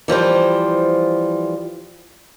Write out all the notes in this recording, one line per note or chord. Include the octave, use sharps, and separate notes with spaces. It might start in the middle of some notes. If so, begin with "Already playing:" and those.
E3 F3 G3 C5